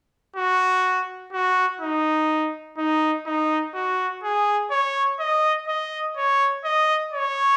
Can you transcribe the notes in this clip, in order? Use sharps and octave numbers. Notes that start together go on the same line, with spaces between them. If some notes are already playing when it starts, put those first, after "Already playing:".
F#4
F#4
D#4
D#4
D#4
F#4
G#4
C#5
D#5
D#5
C#5
D#5
C#5